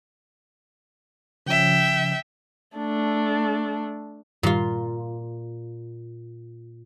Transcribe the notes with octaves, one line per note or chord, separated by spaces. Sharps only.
C#3 F3 C#4 E5 G5
A3 D4
G2 A#2 D#3 G3 F4